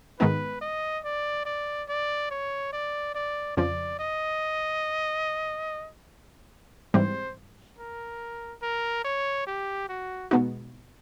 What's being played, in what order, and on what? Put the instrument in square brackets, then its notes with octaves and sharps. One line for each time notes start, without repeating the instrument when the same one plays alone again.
[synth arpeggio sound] G#2 D#3 G#3 B3 D#4 [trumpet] B4
[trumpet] D#5
D5
D5
D5
C#5
D5
D5
[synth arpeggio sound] F2 C#3 F3 [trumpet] D5
[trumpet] D#5
[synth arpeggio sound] G#2 E3 G3 C4 [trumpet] C5
[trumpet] A#4
A#4
C#5
G4
F#4
[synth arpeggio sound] B2 G#3 B3 D#4 F#4